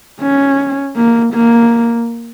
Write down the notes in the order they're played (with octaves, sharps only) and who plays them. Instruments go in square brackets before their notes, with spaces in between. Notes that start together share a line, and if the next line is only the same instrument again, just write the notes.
[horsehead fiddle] C#4
A#3
A#3